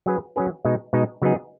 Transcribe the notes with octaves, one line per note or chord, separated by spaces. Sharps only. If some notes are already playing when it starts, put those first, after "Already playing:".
F#3 C#4 G#4 B4
F#3 C#4 G#4 B4
B2 G#3 D#4
B2 G#3 D#4
C#3 F#3 B3 D#4 G#4